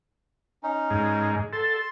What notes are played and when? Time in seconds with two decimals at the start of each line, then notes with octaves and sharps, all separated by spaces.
0.63 C#4 D#4
0.91 G#2
1.53 A4 C6